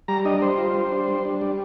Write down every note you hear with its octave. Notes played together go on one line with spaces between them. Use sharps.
G3 A#5
D4 D#5
G3 C5
F4
G3
D4
G3
D4
G3